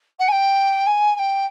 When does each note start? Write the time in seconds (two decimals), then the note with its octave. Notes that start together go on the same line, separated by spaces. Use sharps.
0.19 F#5
0.28 G#5
0.32 G5
0.86 G#5
1.15 G#5
1.18 G5